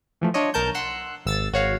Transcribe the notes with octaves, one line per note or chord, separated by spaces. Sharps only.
E3 F3 A3
D4 F4 C#5 D#5
B1 A#4 A5 G6
F#5 C6 E6 F#6
G#1 E6 A6
G#1 F#4 C#5 F5